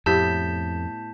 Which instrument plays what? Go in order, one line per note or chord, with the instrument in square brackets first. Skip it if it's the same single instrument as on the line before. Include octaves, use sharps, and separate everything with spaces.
[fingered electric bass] F2 [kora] A2 B3 [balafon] G4 [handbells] A5 G6 B6